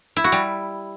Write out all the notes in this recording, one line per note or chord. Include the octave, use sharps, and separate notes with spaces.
E4
F#4
G3